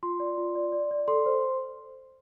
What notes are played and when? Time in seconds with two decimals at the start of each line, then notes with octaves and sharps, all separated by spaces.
0.03 F4 C6
0.20 D5
0.38 F4
0.55 D5
0.72 D5
0.91 D5
1.08 A4 C6
1.26 C5